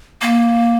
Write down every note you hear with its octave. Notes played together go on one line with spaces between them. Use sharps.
A#3